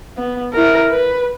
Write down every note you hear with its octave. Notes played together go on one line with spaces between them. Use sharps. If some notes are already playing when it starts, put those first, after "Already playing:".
B3
E4 A#4
B4